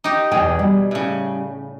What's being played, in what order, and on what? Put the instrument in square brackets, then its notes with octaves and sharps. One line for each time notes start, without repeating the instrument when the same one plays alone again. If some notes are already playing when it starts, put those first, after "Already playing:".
[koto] D#4 G4
[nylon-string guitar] E2 G5 [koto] B2 G#4
[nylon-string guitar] G3
[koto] A2 C#3